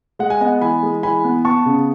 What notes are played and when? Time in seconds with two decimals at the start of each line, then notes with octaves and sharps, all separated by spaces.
0.19 G#3 F#5
0.30 G#5
0.41 B3 D#5 F#5
0.61 E3 G#5 B5
0.83 G#3
1.03 E3 G#5 B5
1.24 B3
1.45 B3 A5 C#6
1.66 C#3